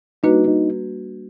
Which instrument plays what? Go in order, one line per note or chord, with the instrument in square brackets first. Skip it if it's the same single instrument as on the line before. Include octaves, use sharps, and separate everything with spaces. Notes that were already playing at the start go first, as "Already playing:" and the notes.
[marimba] G3 A#3 D4 F#4 B4 [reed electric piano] D#4
[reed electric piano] D#4